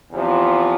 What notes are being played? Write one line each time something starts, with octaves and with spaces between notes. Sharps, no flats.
E2 C3 F3